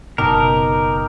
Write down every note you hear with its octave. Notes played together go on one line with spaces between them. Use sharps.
F#1 B2 D#4 G4 A#4 A5